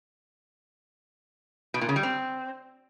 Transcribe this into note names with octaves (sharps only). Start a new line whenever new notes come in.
B2
A#2
C#3
G3
C4